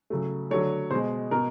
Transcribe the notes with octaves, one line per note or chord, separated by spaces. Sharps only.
C#3 F#3 A3
D3 F#3 A3 C#5
B2 G#3 C5
B2 A#4